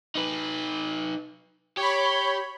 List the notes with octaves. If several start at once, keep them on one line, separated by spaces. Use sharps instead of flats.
D#4 B4
G4 C#5 B5